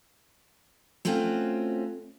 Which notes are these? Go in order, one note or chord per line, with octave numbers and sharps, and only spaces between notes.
A3 C4 C#4 F4 F#4